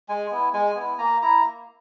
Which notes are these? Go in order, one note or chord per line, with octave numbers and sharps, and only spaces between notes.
G#3 G#5
B3 E4
G#3 G#5
B3 E4
A#3 A#5
E4 A#5
A#3